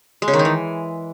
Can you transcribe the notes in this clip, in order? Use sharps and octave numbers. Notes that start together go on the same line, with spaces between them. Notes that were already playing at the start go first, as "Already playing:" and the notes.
G#3
C#3
D#3
D#4
E3